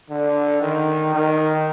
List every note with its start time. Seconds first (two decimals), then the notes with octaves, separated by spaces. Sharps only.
0.10 D3
0.62 D#3
1.14 D#3